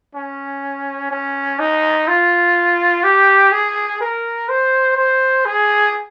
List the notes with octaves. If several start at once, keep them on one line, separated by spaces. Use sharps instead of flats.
C#4
C#4
D#4
F4
G4
G#4
A#4
C5
C5
G#4